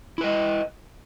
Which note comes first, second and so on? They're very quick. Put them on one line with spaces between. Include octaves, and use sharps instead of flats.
E4 B4 D#5